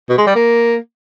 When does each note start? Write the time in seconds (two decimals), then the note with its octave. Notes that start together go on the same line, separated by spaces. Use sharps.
0.09 B2
0.18 G#3
0.27 G3
0.35 A#3